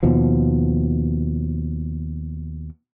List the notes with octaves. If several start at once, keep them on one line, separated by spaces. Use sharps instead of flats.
D#2 B2 F3